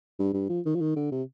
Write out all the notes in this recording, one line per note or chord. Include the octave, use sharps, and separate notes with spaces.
G2
G2
F3
D#3
F3
D#3
D3
C3